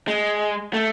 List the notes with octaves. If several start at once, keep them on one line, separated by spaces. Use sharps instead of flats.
G#3
A3